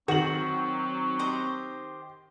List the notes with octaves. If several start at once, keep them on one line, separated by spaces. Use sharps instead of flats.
D#3 F#3 C4 F#4 F#7
G4 C5 D#5